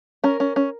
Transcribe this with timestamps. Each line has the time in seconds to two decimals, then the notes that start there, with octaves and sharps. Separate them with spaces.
0.24 C#4 A#4
0.40 C#4
0.56 C#4